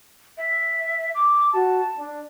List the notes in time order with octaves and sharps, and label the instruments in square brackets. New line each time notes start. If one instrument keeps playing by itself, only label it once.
[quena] E5
D6
[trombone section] F#4 [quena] A5
[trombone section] D4